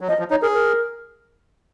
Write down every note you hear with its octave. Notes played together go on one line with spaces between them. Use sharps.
F#3
F3 D#5
F3
D#4 C#5
G#4 A#4
A#4